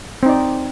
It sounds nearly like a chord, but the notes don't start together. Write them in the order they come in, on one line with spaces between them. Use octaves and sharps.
C4 D#4 D5